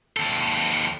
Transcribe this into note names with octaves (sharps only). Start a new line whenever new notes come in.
D#2 A4